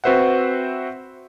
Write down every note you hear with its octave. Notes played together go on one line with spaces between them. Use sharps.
C4 F#4 B4 C5 E5 F#5